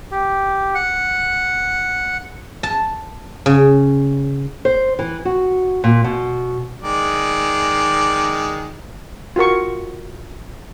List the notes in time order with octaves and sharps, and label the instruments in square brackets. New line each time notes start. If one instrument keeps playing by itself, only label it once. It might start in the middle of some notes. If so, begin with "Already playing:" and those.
[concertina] G4
F#5
[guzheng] A5
C#3
[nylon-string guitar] C5
E3
F#4
A#2
B2
[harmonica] D#3 G#3 D5
[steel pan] F4 F#4 A#4 C#6